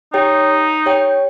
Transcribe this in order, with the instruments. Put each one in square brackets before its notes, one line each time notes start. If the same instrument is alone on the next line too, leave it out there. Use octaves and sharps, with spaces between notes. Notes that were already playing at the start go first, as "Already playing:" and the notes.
[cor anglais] D#4 [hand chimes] G4 C#5 G5
[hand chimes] G4 C#5 G5